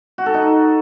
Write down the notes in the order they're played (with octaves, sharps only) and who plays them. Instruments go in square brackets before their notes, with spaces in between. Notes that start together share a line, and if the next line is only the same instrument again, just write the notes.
[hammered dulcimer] F#4
A4
D#4